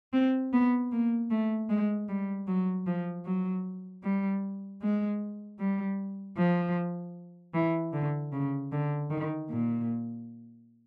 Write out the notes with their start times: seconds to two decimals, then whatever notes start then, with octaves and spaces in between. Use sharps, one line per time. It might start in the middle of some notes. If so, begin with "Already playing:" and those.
0.13 C4
0.53 B3
0.92 A#3
1.31 A3
1.69 G#3
2.08 G3
2.47 F#3
2.87 F3
3.25 F#3
4.03 G3
4.82 G#3
5.59 G3
6.37 F3
7.54 E3
7.93 D3
8.33 C#3
8.72 D3
9.10 D#3
9.50 A#2